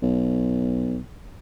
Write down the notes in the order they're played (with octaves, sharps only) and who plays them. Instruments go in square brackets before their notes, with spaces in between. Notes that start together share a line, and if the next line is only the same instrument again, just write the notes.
[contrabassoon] B1